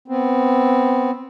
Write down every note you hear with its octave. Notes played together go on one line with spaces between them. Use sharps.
B3 C4